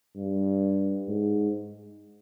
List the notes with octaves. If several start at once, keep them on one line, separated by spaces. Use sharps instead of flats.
G2
G#2